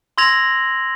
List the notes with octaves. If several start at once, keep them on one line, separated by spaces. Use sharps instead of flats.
C6 E6 G#6 A#6 F7 F#7